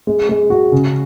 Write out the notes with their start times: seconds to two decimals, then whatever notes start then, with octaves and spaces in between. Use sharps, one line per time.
0.07 G#3
0.29 G#3
0.50 F#4
0.72 C#3